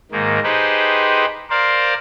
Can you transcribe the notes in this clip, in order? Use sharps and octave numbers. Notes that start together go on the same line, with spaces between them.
G#2 D#3 A#3
D#4 G4 G#4 B4 C5
A#4 C5 D5 F5